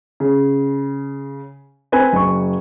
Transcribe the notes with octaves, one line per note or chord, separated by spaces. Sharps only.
C#3
C4 B4 G#5
F#1 C#6